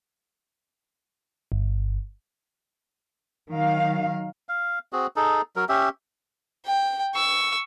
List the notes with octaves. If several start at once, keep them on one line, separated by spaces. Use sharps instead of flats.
G1
D#3 F#3 F5
F5
C4 F#4 G#4
D#4 G#4 A4
F#3 A#4
C#4 G4 E5
G5
C#6 E6